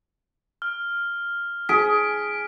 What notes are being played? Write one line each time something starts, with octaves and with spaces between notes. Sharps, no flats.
F6
G#4 B6 D7